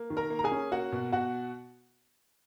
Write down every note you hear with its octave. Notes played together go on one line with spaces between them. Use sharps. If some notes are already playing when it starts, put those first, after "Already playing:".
Already playing: A#3
D#3
A#4 A#5
A#3
A#5
G#4 G#5
C#4
A#3 F#4 F#5
B2
B2 F#4 F#5